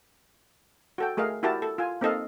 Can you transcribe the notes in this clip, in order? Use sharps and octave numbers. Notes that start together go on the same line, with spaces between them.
F#4 A4 G5
A3 G#4 A#4 D#5 F5
E4 F#4 G4 A#4 A5
A4
F4 G#5
A#3 C4 D#4 A4 D#5 F5